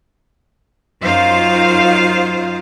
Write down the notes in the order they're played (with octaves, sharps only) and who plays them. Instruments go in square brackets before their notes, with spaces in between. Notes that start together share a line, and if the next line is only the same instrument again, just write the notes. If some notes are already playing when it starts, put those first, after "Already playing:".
[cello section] F#2 D#4 F4 C5 F5